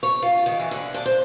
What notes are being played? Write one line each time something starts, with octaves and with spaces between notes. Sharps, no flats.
C#5
F4
D#3
E3
D3
D4
C5